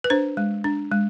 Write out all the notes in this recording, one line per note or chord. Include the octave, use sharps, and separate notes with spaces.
B4
D4 C5
G#3
D4
G#3